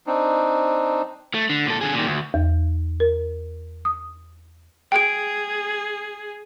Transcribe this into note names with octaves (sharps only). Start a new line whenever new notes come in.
C4 D4 D#4
A3
D3
A#2 A4
D3 G#4
A#2 D#3
D2
E2
A#4
D#6
G#4 G5 D7